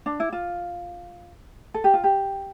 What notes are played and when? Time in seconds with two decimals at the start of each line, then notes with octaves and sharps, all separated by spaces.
0.06 D4
0.20 E4
0.33 F4
1.74 A4
1.84 G4
1.94 F4
2.04 G4